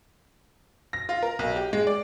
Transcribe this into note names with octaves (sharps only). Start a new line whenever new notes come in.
A#6
F4
A#4
B1
G4
G#3
D5